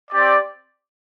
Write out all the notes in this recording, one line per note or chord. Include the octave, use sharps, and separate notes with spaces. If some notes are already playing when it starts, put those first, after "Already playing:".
C4 G4 D5